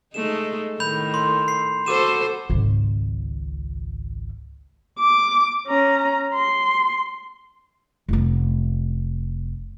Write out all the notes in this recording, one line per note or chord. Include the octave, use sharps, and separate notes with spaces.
G#3 A3 D#4 E7
A2 D#3 B5 G6 F7
C6
C7
F#4 A4 C5 D6 D#7 E7
G#1 C#2
D6
C#4 A#5
C6
F1 B3